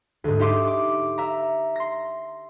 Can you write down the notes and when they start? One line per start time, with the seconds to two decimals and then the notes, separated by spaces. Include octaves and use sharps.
0.24 D2 G#2
0.40 D#4 G4 E5 C6 D6 D#6
0.68 D6
1.18 E5 A#5
1.76 C6 A#6